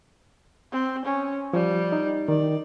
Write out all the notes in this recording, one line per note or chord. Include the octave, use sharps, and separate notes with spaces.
C4
C#4
F3 G3
D#4
D#3 D5